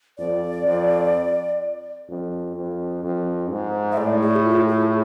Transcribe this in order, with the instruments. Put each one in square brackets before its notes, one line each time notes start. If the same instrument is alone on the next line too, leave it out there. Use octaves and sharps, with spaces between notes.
[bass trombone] F2 [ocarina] D5
[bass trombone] F2
F2
F2
F2
G#2
[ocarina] E5
[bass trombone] A2 [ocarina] D5
[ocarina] G#4
E4
F4
G#4